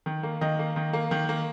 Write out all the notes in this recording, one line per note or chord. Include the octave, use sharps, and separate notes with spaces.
D#3
A#3
D#3 D#5
A#3
D#3
A#3
D#3
A#3